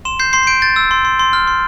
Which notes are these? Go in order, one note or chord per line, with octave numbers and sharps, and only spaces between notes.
C6 E7
G6 C7
C6 C7
C7
G6 D7
G6 A6
E6
C6
C6
C6
F6
C6